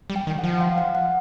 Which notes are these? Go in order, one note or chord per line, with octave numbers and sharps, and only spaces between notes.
G3
G5
D#3
F#5
F3
F5
F#5
F#5